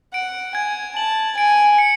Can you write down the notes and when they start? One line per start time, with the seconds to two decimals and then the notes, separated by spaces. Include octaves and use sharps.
0.13 F#5 D7
0.55 G#5 G#6
0.96 A5 F#7
1.38 G#5 D7
1.78 C#7